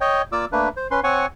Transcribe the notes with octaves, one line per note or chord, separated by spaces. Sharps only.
C#5 D#5 G5
A#3 F4 D5 D6 E6
A3 A#3 D4 B4
C5
C#4 B4 C6
C4 C#5 F#5 G#5 C#6